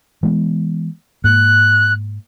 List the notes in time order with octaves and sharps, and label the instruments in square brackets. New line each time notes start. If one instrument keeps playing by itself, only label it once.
[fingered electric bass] E3 G#3 B3
[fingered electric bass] G#2 A#3 [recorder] F#6